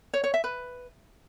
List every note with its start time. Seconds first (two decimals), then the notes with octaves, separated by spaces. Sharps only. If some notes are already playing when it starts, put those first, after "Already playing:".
0.14 C#5
0.24 C#5
0.34 E5
0.44 B4